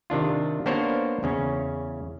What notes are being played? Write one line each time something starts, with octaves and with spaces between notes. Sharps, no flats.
C3 D#3 D4 F4
A#3 B3 D4 A#4 C5 C#5
E2 C#3 C#4